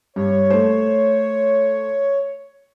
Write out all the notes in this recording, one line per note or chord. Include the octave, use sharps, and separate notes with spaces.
G2 C#5
A3 C5